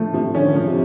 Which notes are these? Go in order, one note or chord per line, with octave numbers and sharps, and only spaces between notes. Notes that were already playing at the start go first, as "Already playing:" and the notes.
Already playing: F3 A3
C3 F3
D3 C#4
D#3
D3
C#3 F3
C3